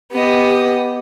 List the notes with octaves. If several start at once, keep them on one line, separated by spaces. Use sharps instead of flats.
B3 G4 D#5